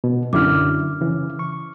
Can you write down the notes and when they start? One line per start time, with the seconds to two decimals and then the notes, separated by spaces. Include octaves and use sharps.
0.04 B2
0.33 F#2 D3 E4 D6 F6
1.01 C#3 E3
1.39 C#6